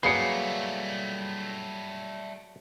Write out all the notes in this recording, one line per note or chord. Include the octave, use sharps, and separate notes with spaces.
F#3 G3 A3 A#3 G#4 B4 C7 C#7